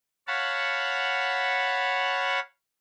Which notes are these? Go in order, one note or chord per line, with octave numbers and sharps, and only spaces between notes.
C#5 F5 F#5 A5 B5